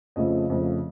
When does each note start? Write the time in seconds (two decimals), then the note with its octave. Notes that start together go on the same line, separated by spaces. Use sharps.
0.16 F2 C#3 F3 A3 D#5
0.50 F2 C#3 F3 A3